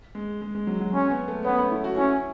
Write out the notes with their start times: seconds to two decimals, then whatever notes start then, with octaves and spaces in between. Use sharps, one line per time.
0.15 G#3
0.42 G#3
0.55 G#3
0.67 F#3
0.80 F#3
0.93 G#3 C#4
1.11 B3
1.28 A3
1.45 B3 C#4
1.58 A3
1.71 E4
1.84 F#4
1.96 C#4 E4